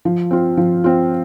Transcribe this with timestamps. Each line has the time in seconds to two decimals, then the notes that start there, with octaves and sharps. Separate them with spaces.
0.05 F3
0.31 C4 F4
0.57 F3
0.84 C4 F4